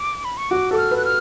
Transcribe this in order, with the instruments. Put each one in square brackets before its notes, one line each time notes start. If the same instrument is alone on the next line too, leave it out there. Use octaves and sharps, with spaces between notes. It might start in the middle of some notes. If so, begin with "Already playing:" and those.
Already playing: [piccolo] D6
B5
C#6
[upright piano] F#4 [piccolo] D6
[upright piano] A4 [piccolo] D6
[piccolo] F6
[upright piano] B4
[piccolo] F#6
F6